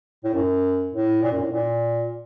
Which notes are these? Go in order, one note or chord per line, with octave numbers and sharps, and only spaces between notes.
A2
F#2
A2
A#2
F#2
A2
A#2